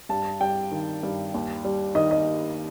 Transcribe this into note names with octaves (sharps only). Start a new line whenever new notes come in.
G2 A5
G3 G5
D#3
G2
D#2
G3
D#3 D#5
D#5